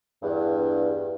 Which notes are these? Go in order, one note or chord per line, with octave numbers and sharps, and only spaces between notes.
E2 G2